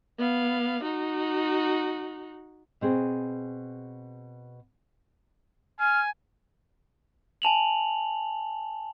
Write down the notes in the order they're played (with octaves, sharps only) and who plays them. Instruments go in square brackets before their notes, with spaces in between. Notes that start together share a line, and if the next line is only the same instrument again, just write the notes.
[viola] B3 F5
D#4 F#4
[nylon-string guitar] B2 C4 G#4
[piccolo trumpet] G#5 [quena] F6
[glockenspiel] G#5 A5 F7 F#7